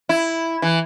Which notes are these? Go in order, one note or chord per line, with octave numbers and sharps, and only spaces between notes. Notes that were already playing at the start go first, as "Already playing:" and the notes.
E4
E3